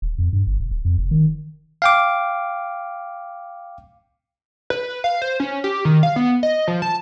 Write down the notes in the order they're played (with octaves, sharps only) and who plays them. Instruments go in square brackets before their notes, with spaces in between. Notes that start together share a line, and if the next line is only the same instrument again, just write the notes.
[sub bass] D#1
F2
G2
G1
E1
D#1
F2
F1
D#3
[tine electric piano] F5 G5 D6
[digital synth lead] B4
F5
C5
C#4
G4
D#3
F5
B3
D#5
F3
A5